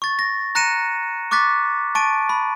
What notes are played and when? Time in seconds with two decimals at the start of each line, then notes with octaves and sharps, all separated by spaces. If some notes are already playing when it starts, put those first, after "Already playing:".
0.02 C#6 A6
0.19 A#6
0.55 A#5 F#6 A#6 C#7 D#7 E7
1.31 C#6 D6 F#6 A6 B6
1.95 A5 C#6 A6 D7 D#7
2.29 B5